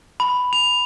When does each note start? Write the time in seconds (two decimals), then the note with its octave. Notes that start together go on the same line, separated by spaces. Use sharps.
0.20 B5
0.53 F7